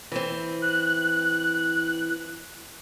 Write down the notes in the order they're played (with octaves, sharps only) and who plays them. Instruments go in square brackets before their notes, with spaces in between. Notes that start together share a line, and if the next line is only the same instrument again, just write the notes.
[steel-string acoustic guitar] E3 C4
[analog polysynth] F#6